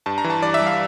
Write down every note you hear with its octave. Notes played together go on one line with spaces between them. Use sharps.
G2 A5
A#5
E3
A5
G2 D5
E5
G3
F5